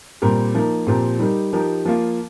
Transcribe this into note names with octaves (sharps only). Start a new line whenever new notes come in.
A#2 G3 C4 G4 A#4
F3 A#3 D#4 A#4
A#2 F3 C4 G4 A#4
G3 D#4 G4 A#4
F3 D#4 G4 A#4
F3 A#3 F4